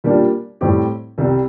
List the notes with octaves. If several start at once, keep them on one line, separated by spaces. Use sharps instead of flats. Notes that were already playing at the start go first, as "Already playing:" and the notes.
A#2 G3 A#3 D4
A2 G3 C4 G4
C2 C3 G3